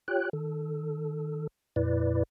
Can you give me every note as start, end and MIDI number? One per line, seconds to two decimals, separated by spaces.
0.08 0.29 65
0.08 0.29 67
0.08 0.29 73
0.08 0.29 79
0.08 0.29 90
0.33 1.47 51
0.33 1.47 69
1.76 2.23 41
1.76 2.23 46
1.76 2.23 64
1.76 2.23 71
1.76 2.23 74